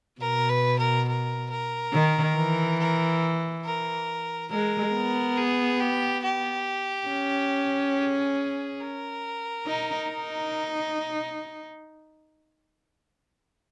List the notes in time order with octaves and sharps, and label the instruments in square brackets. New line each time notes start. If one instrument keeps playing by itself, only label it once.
[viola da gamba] B2 [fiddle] A#4
[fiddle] B4
A#4
A#4
A#4
[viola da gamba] D#3
E3
[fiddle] A#4
A#4
[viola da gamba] G#3 [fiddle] A#4
[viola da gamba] B3
[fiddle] G#4
G4
G4
[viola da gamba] C#4
[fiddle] G#4
A#4
[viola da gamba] D#4
D#4